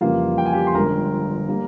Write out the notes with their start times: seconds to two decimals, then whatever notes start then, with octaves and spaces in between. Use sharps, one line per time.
0.01 F2 C#3 E3 G3 A#3 F4 F5
0.38 G5
0.46 G#5
0.53 G4 G5
0.67 C6
0.74 G1 G2 F3 G#3 A#4 A#5
1.49 G3 A#3